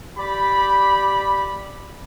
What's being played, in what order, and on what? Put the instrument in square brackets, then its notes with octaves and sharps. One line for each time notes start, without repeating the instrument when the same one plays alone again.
[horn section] G4 D5 B5